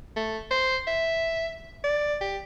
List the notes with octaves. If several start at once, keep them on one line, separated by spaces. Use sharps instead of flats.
A3
C5
E5
D5
G4